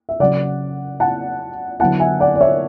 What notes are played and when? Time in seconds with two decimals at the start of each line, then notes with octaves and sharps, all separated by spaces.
0.09 E5
0.20 C#3 F#3 C#4 D5 F#5
1.00 F#5 A5
1.80 D3 F#3 B3 E4 F#5 A5
2.00 E5 G#5
2.20 D5 F#5
2.35 D5
2.41 C#5 E5